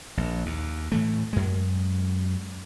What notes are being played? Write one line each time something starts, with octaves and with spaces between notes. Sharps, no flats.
A#1
D#2
A2 E3 A3
F#2 G#3